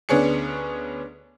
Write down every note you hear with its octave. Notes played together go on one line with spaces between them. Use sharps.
D2 B3 C#4 D4 G#4 C#7